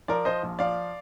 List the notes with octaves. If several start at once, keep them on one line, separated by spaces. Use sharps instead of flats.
F3 A#4 D5
F3 C5 D#5
A#1
F3 D5 F5